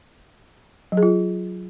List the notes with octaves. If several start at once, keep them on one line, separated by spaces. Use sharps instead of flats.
F#3
G#4
F4